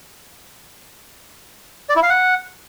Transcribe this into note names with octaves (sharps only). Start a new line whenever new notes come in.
D5
E4
F5
F#5